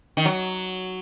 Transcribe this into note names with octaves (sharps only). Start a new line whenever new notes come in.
D#3
F#3